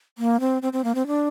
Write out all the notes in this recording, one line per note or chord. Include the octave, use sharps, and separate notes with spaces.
A#3
C4
C4
C4
A#3
C4
D4